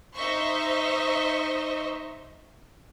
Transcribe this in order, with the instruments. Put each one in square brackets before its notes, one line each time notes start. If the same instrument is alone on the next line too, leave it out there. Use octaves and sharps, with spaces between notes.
[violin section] D#4 C5 D#5 E5 C#6